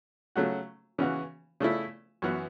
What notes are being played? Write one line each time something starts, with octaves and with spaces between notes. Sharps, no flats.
C#3 F#3 A3 F#4
C#3 E3 C#4 F#4
C#3 A3 C#4 E4
F#2 E3 B3 F#4